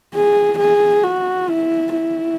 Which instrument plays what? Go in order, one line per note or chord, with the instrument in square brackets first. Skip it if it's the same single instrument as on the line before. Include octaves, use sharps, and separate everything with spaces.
[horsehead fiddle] G#4
G#4
F#4
E4
E4